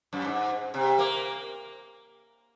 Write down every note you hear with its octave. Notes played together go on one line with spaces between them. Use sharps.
F#2
G#2
C3
A#3